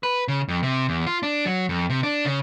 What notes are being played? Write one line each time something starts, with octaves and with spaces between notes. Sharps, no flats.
B4
C#3
F2
C3
E2
F4
D4
F#3
F2
C3
D4
C#3